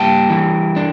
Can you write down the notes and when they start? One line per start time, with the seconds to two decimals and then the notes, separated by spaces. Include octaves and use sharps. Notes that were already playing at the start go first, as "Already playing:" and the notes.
Already playing: G3 A#3 G5 A5
0.30 E3
0.76 D4